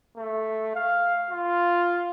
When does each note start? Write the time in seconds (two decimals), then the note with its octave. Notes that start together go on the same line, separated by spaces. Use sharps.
0.17 A3
0.75 F5
1.31 F4